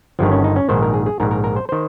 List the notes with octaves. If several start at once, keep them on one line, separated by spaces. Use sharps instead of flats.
G1 G2 D#3 F3
C#4
D#4
C#4
A#1 G#2 D#3 C5
A#4
G#4
G#4
A#1 G#2 D#3 A#4
A#4
A#4
C5
D#3 C5